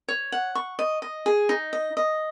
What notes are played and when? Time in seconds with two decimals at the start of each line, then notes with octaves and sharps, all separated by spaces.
0.08 C#5
0.32 F#5
0.55 C#6
0.79 D#5
1.02 D#5
1.26 G#4
1.49 D#4
1.73 D#5
1.97 D#5